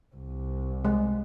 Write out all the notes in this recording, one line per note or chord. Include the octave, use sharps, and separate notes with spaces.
C2
G#3